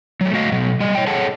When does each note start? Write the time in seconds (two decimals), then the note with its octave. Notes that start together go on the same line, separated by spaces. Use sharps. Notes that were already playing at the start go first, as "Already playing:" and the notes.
0.21 F#3 A3
0.33 A3 F#4 D#5 F5
0.52 B2 F#3
0.80 G3 D#5
0.95 C#5 G5
1.07 G#4 A4 C#5 F#5 A5